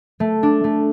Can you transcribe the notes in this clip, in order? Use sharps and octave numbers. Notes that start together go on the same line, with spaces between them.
A3
D4
A3